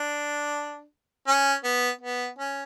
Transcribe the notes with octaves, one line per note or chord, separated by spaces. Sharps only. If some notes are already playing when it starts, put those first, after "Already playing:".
Already playing: D4
C#4
B3
B3
C#4